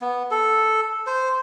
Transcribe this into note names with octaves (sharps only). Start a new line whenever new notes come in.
B3
A4
C5